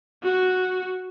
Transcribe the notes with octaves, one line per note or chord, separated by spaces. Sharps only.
F#4